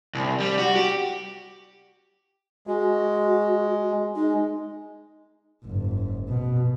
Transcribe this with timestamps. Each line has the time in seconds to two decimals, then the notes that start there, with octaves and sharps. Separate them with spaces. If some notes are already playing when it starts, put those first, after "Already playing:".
0.15 C2
0.40 G3
0.59 F#4
0.76 G4
2.67 G#3 F#4
4.16 G#3 D#4
5.65 F#1 G#2
6.28 B2